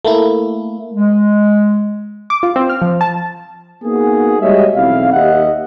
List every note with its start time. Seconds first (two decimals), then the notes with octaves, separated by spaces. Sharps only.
0.05 A3 A#3 E4
0.92 G#3
2.30 D6
2.43 F4
2.56 C4
2.69 F6
2.82 F3
3.01 A5
3.84 A#3 B3 D#4 F#4 G#4
4.41 G3 G#3 F#4 C#5 D#5 E5
4.76 B1 E2 C4 E4 F5
5.12 D#2 D#3 G4 D#5 E5 F#5